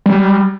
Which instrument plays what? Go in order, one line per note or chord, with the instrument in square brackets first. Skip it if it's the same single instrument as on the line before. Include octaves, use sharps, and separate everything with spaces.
[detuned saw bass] G3